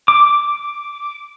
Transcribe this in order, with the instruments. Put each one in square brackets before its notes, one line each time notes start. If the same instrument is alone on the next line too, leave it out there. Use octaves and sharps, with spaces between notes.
[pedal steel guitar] D6